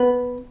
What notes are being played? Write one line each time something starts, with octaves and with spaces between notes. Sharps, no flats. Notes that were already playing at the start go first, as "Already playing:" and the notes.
Already playing: B3